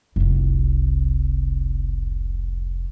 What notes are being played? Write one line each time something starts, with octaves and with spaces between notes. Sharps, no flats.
F1 C2